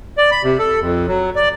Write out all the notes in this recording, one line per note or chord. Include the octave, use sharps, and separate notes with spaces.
D5
B5
C3
A4
F2
F#3
D5